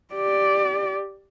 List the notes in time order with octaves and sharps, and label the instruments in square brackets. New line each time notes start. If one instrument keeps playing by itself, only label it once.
[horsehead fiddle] G4 D5